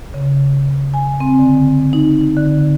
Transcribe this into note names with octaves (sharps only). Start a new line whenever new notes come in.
C#3
G#5
C4
D3
D#4
D3